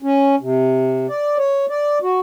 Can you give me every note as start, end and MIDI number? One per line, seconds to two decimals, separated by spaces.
0.02 0.35 61
0.41 1.07 48
1.09 1.37 74
1.38 1.66 73
1.69 1.99 74
2.02 2.20 66